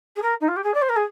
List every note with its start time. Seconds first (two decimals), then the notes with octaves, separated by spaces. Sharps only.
0.16 G#4
0.22 A#4
0.41 D#4
0.48 F4
0.56 G4
0.64 G#4
0.74 D5
0.82 C5
0.89 A#4
0.96 G#4